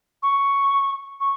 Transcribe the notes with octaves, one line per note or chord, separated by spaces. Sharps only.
C#6
C#6